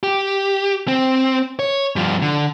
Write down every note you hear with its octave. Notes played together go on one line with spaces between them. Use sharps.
G4
C4
C#5
G2 F3
D3